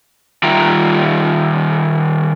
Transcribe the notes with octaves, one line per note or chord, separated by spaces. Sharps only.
D#3 G3 F4 E5 G5 A#5